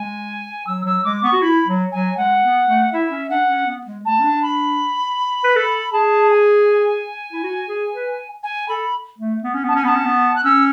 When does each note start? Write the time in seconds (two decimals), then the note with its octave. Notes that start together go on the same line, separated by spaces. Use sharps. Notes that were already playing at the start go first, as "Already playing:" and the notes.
Already playing: G#3 G#5
0.67 F#3 E6
0.85 F#3 E6
1.04 G#3 D6
1.24 B3 C#6
1.33 F#4
1.42 E4 B5
1.67 F#3
1.92 F#3 G#5
2.17 G#3 F#5
2.43 B3
2.67 A3
2.92 E4 E5
3.11 C#4
3.29 D4 F#5
3.49 C#4
3.67 B3
3.87 G#3
4.05 A3 A5
4.19 C#4
4.24 D4
4.42 B5
5.44 B4
5.56 A4
5.93 G#4 A5
6.31 G#5
7.33 E4
7.44 F#4
7.68 G#4
7.93 B4
8.43 G#5
8.69 A4 B5
9.18 A3
9.44 B3
9.54 C#4
9.64 B3 A5
9.75 C#4 G#5
9.84 B3 B5
9.88 A5
9.96 C#4
10.05 B3
10.36 F#6
10.44 C#4 E6